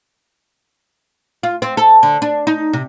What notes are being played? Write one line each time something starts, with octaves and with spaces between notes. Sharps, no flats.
F4
C4
A4
D3
D4
D#4
C3